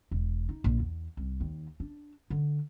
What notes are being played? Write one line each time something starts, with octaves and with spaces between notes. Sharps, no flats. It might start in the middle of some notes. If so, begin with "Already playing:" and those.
E1
D#4
A#1
E2
C2
D#2
D4
D3